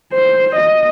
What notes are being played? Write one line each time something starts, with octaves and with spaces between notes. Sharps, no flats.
C5
D#5